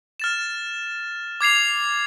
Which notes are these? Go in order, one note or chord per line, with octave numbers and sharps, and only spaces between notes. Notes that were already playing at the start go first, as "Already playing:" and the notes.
F6 A6 E7
D6 G#6 C7 F7